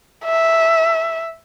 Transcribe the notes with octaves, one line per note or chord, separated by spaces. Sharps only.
E5